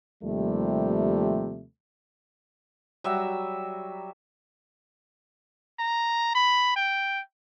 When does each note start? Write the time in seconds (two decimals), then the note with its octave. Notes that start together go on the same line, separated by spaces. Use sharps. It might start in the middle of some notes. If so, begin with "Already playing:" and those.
0.23 D#2 C3 F3 G3 A3
3.04 F#3 G3 E5
5.79 A#5
6.35 B5
6.76 G5